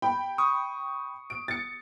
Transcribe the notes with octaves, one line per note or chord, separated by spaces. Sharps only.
G5 B5
C#6 D#6
D7
A6 C#7